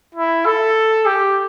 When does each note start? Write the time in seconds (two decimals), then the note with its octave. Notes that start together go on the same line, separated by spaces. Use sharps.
0.15 E4
0.46 A4
1.06 G4